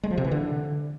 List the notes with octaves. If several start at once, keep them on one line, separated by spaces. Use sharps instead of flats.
G#3
F3
C3
E3
D3